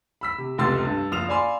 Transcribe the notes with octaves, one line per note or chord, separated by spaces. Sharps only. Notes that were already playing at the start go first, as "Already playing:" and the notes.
B5 E6 B6
C3
F1 C#2 C3 C6 E6 A6
G2
F#1 F3 F4 D#6 E7 F7
D5 F5 G#5 B5 C6